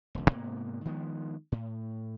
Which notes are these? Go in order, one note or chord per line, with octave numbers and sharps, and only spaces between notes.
E1 C#2
G#2 C3 A#3 B3
D#3 F3 G#3 B3
A2